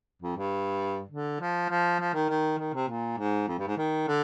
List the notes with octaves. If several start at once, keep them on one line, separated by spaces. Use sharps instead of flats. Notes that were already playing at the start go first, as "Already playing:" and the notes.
F2
G2
D3
F3
F3
F3
D#3
D#3
D#3
C3
A#2
G#2
F2
G2
G#2
D#3
D3